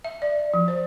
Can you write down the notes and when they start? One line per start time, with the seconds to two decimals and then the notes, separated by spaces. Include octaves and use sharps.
0.04 E5
0.22 D5
0.54 F3
0.68 C5